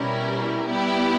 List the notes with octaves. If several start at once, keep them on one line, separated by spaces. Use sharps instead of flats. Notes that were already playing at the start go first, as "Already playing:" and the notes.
Already playing: B2 G3 C#4 E4 A#4
G3 B3 E4 G4